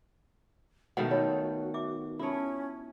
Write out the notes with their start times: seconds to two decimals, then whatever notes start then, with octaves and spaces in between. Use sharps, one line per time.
0.97 B2 D#3 A3 F#4 D#5 F5 F#5
1.11 D#4 F4 A4 C#5
1.74 E5 D6
2.19 C#4 E4 F4 A4 C#5 A5